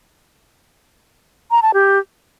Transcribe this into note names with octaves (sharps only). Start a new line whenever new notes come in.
A#5
A5
G4